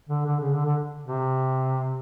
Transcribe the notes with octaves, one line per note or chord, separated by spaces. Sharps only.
D3
D3
C#3
D3
D3
C3